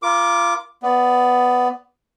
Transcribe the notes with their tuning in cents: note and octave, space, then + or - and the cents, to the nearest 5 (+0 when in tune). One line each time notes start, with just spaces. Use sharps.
F4 -20 A#4 +20 D6 +0
B3 +10 D5 -10